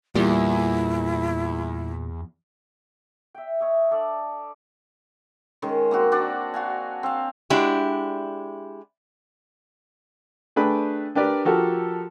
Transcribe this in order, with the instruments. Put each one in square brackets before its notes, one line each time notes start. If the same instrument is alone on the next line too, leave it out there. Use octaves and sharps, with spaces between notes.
[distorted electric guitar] E2 [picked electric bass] A#2 [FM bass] G3 [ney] E4
[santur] E5 G5
C#5 D#5 E5
D4 A4 D5 A5
[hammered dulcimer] D#3 G#3 C#4
A#3 C4 F#4
D4 F#4 D5
F#4 F5 G#5
C4 F5
[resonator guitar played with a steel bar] G#3 D4 E4 F#4 G4
[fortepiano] A3 D4 G#4 B4 G5 B5
D4 G4 A#4 B4 D5
F3 F#4 G4 A4 A#4